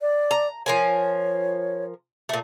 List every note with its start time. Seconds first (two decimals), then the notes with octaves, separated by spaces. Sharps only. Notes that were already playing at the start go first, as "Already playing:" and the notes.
0.01 D5
0.31 A#5
0.66 F3 A#4 C#5 G#5
2.29 A#2 A3